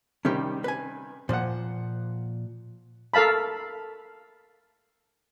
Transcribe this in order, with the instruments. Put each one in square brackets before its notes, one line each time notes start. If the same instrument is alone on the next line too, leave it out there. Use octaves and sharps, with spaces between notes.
[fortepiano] C3 D#3 G3 [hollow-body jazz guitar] C#4 G4
[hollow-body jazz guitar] B4 G#5
[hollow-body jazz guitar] A#2 F3 [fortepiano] C5 F#5
[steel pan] A4 A#4 F5 A5 B5